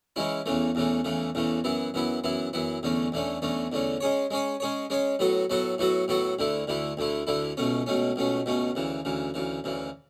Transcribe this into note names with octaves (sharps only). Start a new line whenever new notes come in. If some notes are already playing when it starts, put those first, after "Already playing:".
C#3 E3 G#3 C#4 E4
E2 C#3 E3 A3
E2 C#3 E3 A3
E2 C#3 E3 A3
E2 C#3 E3 A3
F#2 E3 B3 E4
F#2 E3 B3 E4
F#2 E3 B3 E4
F#2 E3 B3 E4
E2 D3 A3 C#4
E2 D3 A3 C#4
E2 D3 A3 C#4
E2 D3 A3 C#4
G#3 C#4 G#4 C#5
G#3 C#4 G#4 C#5
G#3 C#4 G#4 C#5
G#3 C#4 G#4 C#5
A2 F#3 B3 F#4 A4
A2 F#3 B3 F#4 A4
A2 F#3 B3 F#4 A4
A2 F#3 B3 F#4 A4
D2 D3 A3 E4
D2 D3 A3 E4
D2 D3 A3 E4
D2 D3 A3 E4
C#2 B2 A3 C#4
C#2 B2 A3 C#4
C#2 B2 A3 C#4
C#2 B2 A3 C#4
D2 C#3 E3
D2 C#3 E3
D2 C#3 E3
D2 C#3 E3